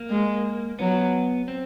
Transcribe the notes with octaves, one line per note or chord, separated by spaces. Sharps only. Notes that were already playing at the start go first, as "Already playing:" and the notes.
Already playing: A#3
G#3
F#3 B3
C4